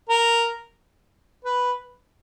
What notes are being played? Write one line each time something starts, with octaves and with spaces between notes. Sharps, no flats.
A#4
B4